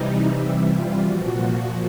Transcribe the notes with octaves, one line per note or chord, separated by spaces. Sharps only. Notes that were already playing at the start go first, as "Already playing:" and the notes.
Already playing: C3 E3 G3 D#4
E4
F4
A#2 F3 F#4